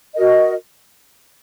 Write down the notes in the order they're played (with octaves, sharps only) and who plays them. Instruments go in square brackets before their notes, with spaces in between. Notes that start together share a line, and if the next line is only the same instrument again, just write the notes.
[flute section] F#4 A#4 D#5